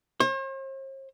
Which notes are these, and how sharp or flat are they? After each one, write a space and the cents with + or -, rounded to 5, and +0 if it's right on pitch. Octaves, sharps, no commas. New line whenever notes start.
C5 +45